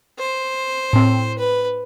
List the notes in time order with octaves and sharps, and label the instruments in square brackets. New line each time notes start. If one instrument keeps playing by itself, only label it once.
[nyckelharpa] C5
[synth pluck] A2 C4
[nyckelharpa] B4